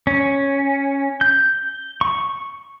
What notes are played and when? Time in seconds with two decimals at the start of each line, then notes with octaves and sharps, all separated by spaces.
0.07 C#4
1.21 G6
2.01 C#6